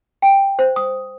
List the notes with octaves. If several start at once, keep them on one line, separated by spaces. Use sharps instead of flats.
G5
C5
D#6